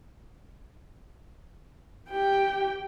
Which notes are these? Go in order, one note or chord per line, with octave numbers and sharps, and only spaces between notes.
G4 G5